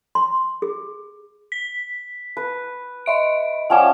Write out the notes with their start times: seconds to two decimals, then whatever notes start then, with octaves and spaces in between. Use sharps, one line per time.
0.15 C6
0.62 G#4
1.52 B6
2.37 B4
3.06 D#5 E5 D7
3.70 F3 C#4 D5 F#5 G5